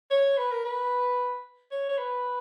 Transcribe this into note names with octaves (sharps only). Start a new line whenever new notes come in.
C#5
B4
A#4
B4
C#5
C#5
B4